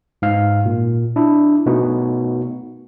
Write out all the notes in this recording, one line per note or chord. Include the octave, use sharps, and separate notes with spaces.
G#2 F5
A#2
D4 E4
B2 A3 B3 D#4 F#4